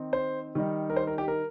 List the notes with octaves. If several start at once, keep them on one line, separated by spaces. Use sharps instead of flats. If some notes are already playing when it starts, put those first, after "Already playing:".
Already playing: D#3 C4 D#4
C5
D#3 G3 D#4
A#4
C5
A#4
G4
A#4